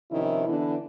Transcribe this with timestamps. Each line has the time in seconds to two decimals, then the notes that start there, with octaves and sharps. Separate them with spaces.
0.11 C3 D#3 F3 C#4 E4
0.48 D3 E3 B3 D4